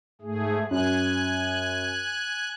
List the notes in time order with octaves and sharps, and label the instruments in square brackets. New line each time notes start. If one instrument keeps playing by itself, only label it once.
[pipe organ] G#2 A3 G#4
[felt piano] F#2 [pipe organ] G#5 F#6